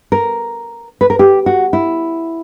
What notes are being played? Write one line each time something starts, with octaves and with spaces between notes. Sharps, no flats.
A#4
B4
A#4
G4
F#4
E4